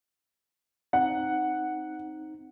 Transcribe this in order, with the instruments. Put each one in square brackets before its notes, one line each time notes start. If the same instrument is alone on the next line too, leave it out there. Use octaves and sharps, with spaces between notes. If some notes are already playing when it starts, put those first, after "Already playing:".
[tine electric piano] C4 D#4 [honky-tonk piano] F#5